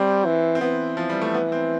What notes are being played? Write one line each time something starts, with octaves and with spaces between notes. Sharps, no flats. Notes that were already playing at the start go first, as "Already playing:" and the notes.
Already playing: G3 C4
E3
C4
E3 B3
F3
G3
A3
B3
C4